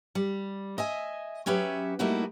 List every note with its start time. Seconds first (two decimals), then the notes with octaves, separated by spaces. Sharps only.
0.15 G3
0.78 D#5 E5 G#5
1.46 F#3 C#4 G4 B4 E5
1.99 G3 A3 A#3 D#4 E4 F#4